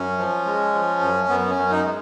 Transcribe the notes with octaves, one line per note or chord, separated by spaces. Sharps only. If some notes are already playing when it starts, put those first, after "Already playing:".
Already playing: F#2 C#4
F3
G#3
F3
F#2
F#2 B3
C#4
F#2
D#4
G#3